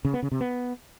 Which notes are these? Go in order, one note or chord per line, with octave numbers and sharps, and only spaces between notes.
C#3
B3
C#3
C3
B3